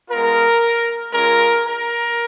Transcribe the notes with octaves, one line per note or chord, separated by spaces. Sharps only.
G#3 B3 F4 A#4
G#3 C#4 F4 A#4
A#4